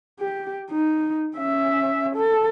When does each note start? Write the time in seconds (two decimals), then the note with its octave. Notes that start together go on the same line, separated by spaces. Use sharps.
0.20 G4
0.71 D#4
1.37 C#4 E5
2.16 A4